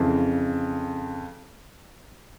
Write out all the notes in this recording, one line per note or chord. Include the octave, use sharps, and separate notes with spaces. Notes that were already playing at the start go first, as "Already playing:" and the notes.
Already playing: F2 C#3 E3